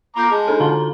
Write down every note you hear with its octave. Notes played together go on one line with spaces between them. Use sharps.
F4 A#5 B5 D6 G6
G#3 A5
D4 D#4 A4
D3 F4 F#4 A#5 G7